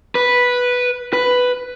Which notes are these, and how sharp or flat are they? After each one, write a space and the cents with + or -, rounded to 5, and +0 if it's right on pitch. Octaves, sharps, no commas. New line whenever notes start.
B4 -5
B4 +5